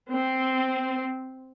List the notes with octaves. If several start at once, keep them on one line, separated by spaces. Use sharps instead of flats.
C4